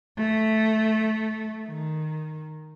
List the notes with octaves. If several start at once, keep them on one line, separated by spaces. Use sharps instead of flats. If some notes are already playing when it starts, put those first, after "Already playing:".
A3
D#3